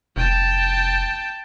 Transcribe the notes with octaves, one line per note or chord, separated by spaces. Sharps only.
F1 G5 A5